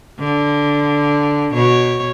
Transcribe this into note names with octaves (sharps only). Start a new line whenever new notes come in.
D3
B2 C#5